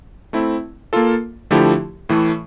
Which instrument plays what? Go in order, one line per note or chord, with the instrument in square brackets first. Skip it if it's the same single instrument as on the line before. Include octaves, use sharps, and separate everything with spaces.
[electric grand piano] A3 C4 E4
A#3 F4 A4
D3 F3 A3 E4 G4
A2 E3 A3